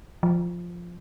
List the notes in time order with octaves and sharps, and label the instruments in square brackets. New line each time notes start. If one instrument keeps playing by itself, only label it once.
[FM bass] F3